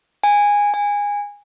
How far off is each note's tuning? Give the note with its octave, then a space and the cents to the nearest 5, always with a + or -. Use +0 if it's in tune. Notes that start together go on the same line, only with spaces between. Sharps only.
G#5 -15
G#5 -20